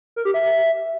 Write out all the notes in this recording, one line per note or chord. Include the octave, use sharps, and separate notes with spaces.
A#4
G4
E5